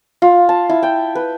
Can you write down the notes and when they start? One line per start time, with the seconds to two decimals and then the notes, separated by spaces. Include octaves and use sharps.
0.22 F4
0.49 A5
0.69 E4
0.83 G5
1.15 B4